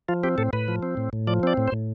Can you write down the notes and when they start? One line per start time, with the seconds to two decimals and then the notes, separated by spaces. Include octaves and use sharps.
0.09 F3 F4
0.23 C4 G4
0.38 A2 A4
0.53 A2 B4
0.68 F3
0.83 C4
0.97 A2
1.13 A2
1.27 F3 D5
1.43 C4 D5
1.57 A2
1.68 C5
1.72 A2